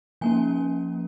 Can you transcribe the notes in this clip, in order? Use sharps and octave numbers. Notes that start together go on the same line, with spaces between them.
F3 A#3 C#4 G#5